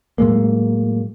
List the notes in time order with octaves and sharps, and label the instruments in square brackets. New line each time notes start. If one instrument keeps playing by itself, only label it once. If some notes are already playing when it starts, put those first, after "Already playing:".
[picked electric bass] A2 F#3 G#3 A#3